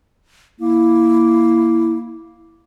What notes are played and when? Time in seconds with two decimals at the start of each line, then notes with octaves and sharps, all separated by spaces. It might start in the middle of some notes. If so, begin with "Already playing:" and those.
0.60 A#3 E4